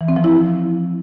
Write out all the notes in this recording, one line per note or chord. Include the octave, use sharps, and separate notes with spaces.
E3
C4
F3
E4